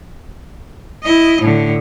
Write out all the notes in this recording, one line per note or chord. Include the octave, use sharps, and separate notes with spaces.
E4 D#5
A2 D3